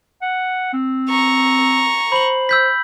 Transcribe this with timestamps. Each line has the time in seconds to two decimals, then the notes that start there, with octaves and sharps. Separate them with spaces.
0.22 F#5
0.73 C4
1.10 A#5 C#6
2.12 C5 B5 F#7
2.49 E6 G6 B6